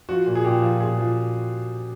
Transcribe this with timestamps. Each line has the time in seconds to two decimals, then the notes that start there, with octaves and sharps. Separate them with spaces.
0.09 F3 F#4
0.26 A#2
0.35 G#4
0.44 A#2 G4
0.62 F3
0.80 A#2 G#4
0.98 F3